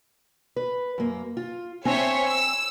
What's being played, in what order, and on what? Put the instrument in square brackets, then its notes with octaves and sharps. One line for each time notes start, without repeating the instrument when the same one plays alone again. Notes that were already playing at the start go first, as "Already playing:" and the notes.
[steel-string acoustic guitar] B4
F#2 A#3
F4
[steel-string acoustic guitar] C4 D4 G#5 [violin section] C5 C#5 E5
[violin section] E6